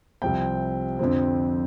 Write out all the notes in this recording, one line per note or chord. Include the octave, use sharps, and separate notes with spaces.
C2 C3 F3 C4 G5
F2 D3 F3 C4